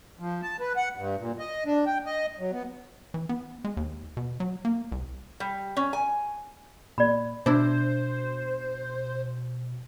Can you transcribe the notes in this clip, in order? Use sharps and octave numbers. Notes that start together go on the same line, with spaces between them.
F3
A5
B4
F#5
G2
A#2
D#5
D4
G5
D#5
F#3
B3
E3
B3
G#3
D#2
B2
F#3
A#3
C2
G3
C#4
G#5
A#2 D5 B5
B2 D4 E4 C5